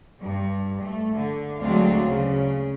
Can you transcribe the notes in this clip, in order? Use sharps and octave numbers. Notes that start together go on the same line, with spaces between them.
G2
A3
D3
D2 F#3 G#3 C4 D4 F5
C#3